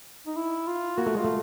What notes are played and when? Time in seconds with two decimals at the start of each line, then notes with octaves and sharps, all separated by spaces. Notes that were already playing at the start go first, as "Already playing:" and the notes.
0.27 D#4
0.37 E4
0.67 F4
0.97 A#3 F#4
1.06 A3
1.15 G#3 F4
1.24 A3